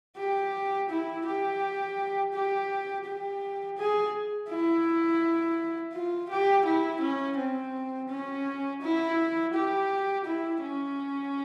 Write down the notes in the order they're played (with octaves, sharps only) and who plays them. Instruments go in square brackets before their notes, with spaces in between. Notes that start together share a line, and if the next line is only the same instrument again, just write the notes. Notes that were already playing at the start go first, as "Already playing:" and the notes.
[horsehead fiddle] G4
E4
G4
G4
G4
G#4
E4
F4
G4
E4
C#4
C4
C#4
E4
G4
E4
C#4